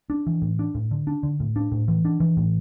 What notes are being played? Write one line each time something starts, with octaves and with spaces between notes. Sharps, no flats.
D4
E3
A2
D4
A2
D3
D4
D3
A2
D4
A2
E3
D4
E3
A2